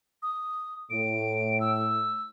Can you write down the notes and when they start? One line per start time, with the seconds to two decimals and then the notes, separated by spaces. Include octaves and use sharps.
0.23 D#6
0.90 A2 D7
1.61 E6